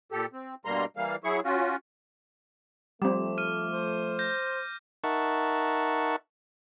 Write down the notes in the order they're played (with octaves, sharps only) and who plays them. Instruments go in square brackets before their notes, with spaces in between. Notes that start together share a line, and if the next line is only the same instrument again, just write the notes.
[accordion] A#2 G4 A4
C4
G2 B2 G3 A#3 A#5 C6
E3 G3 A#3 F5
F#3 E4 G#4 C#6
C#4 F4 F#4
[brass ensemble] F3 A3 [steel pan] G3 C4 [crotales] D6
[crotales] F6 D#7
[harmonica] C5
[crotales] G6 A#6
[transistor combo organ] D#4 A#4 E5 F#5 A5 C#6